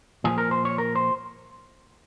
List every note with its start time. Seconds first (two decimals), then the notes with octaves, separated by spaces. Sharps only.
0.24 A#2 F3 G#4
0.38 A#4
0.51 C5
0.65 C#5
0.78 A#4
0.95 C5